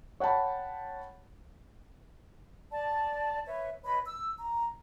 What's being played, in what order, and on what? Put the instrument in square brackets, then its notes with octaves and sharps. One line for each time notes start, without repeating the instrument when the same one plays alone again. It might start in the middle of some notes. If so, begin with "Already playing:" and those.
[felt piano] C#5 F#5 G5 A5 B5
[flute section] D5 A5
B4 C#5 E5
B4 C#5 D#5 B5
E6
A#5